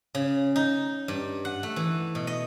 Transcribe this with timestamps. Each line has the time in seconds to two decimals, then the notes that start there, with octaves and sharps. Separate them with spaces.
0.15 C#3
0.56 D#4
1.08 G2
1.45 F#5
1.63 A3
1.76 E3
2.15 B2
2.27 D#5